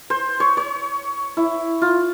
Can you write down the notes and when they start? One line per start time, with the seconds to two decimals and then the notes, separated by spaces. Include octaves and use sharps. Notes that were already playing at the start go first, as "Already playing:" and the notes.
0.10 C5
0.40 C#5
0.57 C#5
1.37 E4
1.82 F4